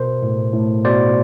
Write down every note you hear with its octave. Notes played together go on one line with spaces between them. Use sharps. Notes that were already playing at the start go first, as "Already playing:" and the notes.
Already playing: B2 A#4 C5
A2
A2
B2 C5 D5